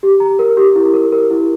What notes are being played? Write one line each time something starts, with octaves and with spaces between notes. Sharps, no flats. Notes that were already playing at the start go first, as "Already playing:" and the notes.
G4
A#5
A#4
G4
E4
A#4
A#4
E4